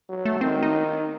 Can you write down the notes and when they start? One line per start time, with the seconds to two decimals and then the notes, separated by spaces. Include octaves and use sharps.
0.09 F#3
0.25 A3
0.41 D#3 C4
0.62 D#4